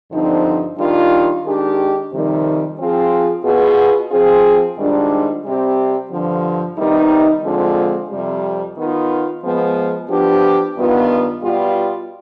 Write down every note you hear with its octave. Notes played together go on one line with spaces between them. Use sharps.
G2 D3 F3 C4 D#4
D#3 G3 D4 F4
D#3 G#3 D4 G4
F2 C3 D#3 G3
F3 C4 F4 G#4
B2 B3 F4 G#4
F3 C4 F4 G#4
G#2 D#3 G3 D4 F4
C3 G3 C4 G4
G2 D3 F3
C3 D#3 G3 B3 D#4
D3 F3 G#3 C4 F4
F2 C3 G3
D#3 B3 F4
F3 G#3 B3
F3 B3 D4 G4
G2 D#3 B3 F4
B2 G3 B3 F4